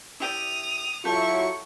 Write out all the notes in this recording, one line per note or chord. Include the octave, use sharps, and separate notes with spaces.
E4 G4 D5 D#6 F7
F#3 E4 F4 G4 A4 C#6